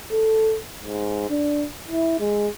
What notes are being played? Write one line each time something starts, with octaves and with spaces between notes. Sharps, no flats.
A4
G#2
D4
E4
G#3